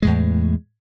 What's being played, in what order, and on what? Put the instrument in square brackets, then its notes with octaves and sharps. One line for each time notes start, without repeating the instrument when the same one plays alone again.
[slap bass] E2 A2 G#3